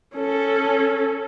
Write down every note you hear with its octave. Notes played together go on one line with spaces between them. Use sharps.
C#4 A4